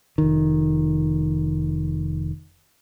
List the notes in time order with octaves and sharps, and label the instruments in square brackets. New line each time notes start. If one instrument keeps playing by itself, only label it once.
[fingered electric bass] F1 D#3